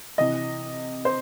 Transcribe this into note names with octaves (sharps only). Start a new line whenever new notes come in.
C3 E3 D#5
C5